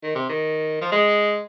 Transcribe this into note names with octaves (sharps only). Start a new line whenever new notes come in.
D#3
C3
D#3
F3
G#3